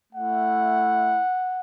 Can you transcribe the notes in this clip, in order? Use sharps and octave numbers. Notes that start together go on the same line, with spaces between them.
A3 E4 F#5